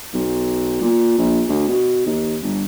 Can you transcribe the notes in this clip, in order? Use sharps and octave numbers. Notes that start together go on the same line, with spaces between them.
B1
A#2
A#1
D2
B2
D#2
G1